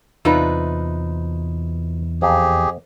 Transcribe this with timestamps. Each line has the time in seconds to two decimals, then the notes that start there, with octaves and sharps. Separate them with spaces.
0.25 E2 C3 D#4 F4 B4 D5
2.22 F2 G4 G#4